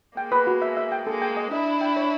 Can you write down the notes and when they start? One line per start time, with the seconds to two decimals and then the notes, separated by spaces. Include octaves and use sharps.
0.17 G#3 A#3 G5
0.32 B4
0.47 F#4
0.62 E5
0.77 E5
0.92 G5
1.07 G#3 A#3 A4
1.22 G5
1.37 D#5
1.51 D4 E4 D#5
1.66 D#5
1.81 G5
1.96 C#5